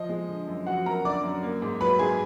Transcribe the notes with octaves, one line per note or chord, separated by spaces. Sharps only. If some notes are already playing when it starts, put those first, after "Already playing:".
Already playing: F3 D#5
G#3
D3
F#2
F3 F#4 F#5
F#2 A#4 A#5
D3 D5 D6
F#2
A#3
G#2
F#3 B4 B5
G#2 G#4 G#5